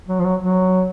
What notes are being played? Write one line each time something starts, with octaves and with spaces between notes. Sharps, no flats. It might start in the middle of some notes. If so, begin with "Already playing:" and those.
F#3
F3
F#3
F#3